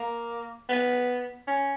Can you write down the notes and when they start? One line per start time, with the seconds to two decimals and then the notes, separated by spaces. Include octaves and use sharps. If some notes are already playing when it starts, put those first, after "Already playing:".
Already playing: A#3
0.69 B3
1.48 C#4